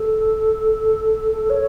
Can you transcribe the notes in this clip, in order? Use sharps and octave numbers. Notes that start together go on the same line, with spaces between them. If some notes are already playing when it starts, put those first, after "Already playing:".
Already playing: A4
C#5